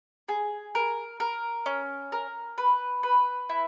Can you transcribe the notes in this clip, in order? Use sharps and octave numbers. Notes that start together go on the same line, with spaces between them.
G#4
A#4
A#4
C#4
A#4
B4
B4
E4